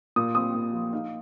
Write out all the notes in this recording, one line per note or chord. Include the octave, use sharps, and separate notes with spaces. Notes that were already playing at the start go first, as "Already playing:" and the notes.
A#2 D#6
C4 D#6
A#2
F3
D#4 F5